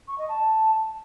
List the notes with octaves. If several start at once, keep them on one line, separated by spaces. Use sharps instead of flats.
C#6
D#5
A5